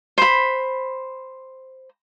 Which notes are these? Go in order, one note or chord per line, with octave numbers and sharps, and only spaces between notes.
C5 B5